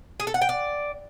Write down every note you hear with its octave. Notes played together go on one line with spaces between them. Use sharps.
G#4
A4
F#5
G5
D5